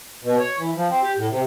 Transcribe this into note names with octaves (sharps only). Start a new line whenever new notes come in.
B2
C#5
E3
F3
C4
G4
A2
C3